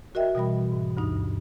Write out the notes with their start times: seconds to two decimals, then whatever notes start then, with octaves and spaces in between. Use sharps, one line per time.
0.15 F#4 A#4 D#5 E5 G5
0.35 B2 E3 G3 B5
0.72 G#2
0.97 D2 G2 D#4